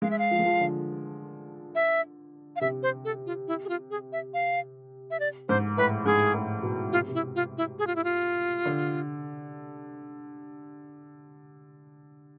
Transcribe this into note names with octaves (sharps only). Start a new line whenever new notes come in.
G#3 F5
E5
F5
F3
G#3
F3
D3
E5
F5
C3 E5
C5
A4
F4
E4
G#4
F4
G#4
E5
F5
E5
D5
G#2 C5
A2 B4
G#2 G#4
A2
B2
C3 F4
B2
C3
E4
F4
E4
G#4
F4
E4
F4
D3